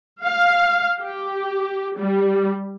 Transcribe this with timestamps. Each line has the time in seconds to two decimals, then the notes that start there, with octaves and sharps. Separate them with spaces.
0.24 F5
0.99 G4
1.97 G3